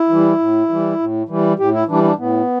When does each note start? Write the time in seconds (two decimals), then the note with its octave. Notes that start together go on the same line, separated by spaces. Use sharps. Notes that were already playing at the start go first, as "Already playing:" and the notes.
Already playing: E4
0.09 E3 G3
0.39 A2
0.69 E3 G3
0.99 A2
1.29 E3 G3
1.59 A2 G4
1.74 E4
1.88 E3 G3 D4
2.04 D4
2.18 A2 B3